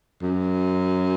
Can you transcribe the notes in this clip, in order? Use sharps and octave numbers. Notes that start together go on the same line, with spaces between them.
F#2